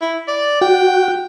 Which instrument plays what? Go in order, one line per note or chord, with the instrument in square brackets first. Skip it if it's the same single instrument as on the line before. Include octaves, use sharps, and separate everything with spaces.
[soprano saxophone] E4
D5
[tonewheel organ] F#4 [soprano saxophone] G5